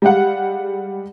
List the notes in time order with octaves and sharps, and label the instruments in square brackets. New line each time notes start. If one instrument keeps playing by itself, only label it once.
[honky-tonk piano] G3 G#3 G4 F5 F#5